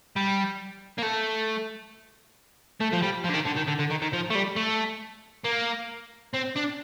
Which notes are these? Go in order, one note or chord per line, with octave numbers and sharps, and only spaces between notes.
G3
A#3
A3
A3
F3
G3
F3
D3
D#3
D3
D#3
D3
D3
D#3
D#3
F3
A3
G3
A3
A#3
C4
D4